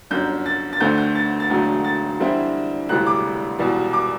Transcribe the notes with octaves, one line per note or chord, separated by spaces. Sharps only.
G1 F#2 D3 G6
A6
A6
D2 D3 A3 C4 G6
G6
A6
A6
E1 D2 D3 F#3 A3
A6
E2 D3 G3 C4 E4
E1 D2 C3 E3 G3 F#6
D6
E1 E2 B2 G3 B3
D6